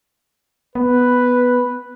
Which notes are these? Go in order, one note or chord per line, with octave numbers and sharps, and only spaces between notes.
B3 B4